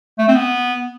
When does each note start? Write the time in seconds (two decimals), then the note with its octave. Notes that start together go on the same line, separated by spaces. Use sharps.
0.18 A3
0.28 C4
0.36 B3